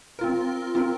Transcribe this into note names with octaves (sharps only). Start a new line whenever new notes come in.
C4 F4 A#4
C4 F4 A#4